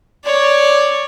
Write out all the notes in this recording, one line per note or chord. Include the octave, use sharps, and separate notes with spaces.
C#5 D5